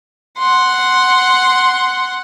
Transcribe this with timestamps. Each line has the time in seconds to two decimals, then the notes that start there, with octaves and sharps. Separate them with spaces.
0.38 F#5 C6